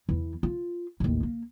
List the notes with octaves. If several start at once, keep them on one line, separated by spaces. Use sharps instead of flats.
E2 E3
F4
A1 D#2
A#3